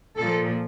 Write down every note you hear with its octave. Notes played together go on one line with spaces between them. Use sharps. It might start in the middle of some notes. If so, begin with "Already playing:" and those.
A#2 F3 A4